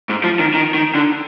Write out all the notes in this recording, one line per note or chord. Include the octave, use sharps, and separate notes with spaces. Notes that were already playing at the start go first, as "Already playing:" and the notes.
G#2
F3
D#3
D#3
D#3
D3